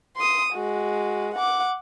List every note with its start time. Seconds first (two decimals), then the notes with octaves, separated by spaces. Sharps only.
0.17 C6 D#6
0.53 G#3 F#4
1.34 F#5 D6